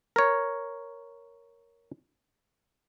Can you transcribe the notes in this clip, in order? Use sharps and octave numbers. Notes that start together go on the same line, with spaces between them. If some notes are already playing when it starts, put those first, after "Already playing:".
A#4 C#5